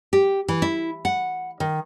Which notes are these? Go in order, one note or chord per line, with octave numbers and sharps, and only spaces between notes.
G4
E3
E4
F#5
D#3